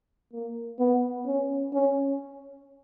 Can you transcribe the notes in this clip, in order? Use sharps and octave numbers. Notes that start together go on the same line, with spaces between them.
A#3
B3
C#4
C#4